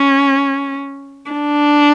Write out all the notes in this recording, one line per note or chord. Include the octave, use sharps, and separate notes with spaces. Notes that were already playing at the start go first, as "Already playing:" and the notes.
Already playing: C#4
D4